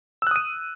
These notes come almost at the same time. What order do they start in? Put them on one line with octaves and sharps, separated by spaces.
E6 F#6 D#6 D#7